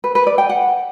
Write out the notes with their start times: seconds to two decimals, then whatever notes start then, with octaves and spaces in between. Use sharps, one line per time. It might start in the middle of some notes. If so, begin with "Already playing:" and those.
0.04 B4
0.15 B4
0.27 D5
0.38 G5
0.49 F#5